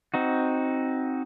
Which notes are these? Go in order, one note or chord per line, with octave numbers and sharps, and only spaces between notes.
C4 D#4 F#4